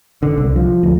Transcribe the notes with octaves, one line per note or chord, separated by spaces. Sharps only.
D3
C2
F3
D2